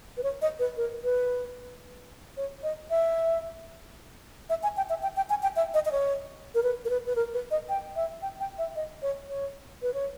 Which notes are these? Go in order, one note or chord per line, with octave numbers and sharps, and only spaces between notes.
B4
C#5
D#5
B4
A#4
B4
C#5
D#5
E5
E5
G#5
G5
E5
G5
G5
G#5
G5
E5
D#5
D#5
C#5
A#4
B4
A#4
B4
B4
A#4
B4
D#5
G5
E5
G5
G5
E5
D#5
C#5
C#5
B4
C#5